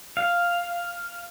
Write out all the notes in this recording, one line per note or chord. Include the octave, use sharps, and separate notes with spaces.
F5